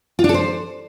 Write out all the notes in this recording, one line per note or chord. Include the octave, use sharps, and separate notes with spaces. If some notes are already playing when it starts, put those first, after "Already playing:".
F4
D4
A4
C5